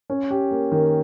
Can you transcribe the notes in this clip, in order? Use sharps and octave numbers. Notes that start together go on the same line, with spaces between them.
C#4
G4
A#3
D#3